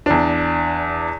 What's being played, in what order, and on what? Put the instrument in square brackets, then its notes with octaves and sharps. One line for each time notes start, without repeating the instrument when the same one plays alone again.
[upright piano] E2 D4